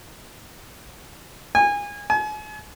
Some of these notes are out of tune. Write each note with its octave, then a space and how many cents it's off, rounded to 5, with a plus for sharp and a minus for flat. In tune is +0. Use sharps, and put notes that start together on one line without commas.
G#5 -25
G#5 +40